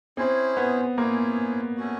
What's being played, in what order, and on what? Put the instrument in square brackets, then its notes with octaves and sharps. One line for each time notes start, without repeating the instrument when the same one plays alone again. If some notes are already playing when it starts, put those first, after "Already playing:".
[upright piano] C4 [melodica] C#4 E4 G#4 C5
[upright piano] B3
[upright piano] A#3 [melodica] C#4 E4 G#4 C5
[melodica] A3 C#4 F#4